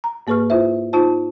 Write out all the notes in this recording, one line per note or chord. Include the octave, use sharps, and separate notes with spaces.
A#5
G#2 A#3 G#4 B4 C#6 F6
E4 F4 C5 E5
D#4 F4 C5 A5